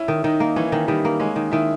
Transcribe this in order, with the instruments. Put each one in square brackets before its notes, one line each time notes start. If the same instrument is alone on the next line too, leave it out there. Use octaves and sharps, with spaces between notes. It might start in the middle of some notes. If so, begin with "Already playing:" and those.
Already playing: [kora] C#4 [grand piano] E4
[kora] D#3
[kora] D#3 [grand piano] D#4
[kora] A#3
[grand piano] E3 [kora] C#4
[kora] D#3
[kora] D#3 [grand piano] G3
[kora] A#3
[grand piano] G#3 [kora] C#4
[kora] D#3
[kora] D#3 [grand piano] E4